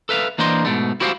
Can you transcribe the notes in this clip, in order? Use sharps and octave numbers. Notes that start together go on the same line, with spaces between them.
A4 B4 E5 F5
E3 A#3 D4 C5 D#5 C6
G#2 B2 A3
E4 F#4 G4 C5 D5 F5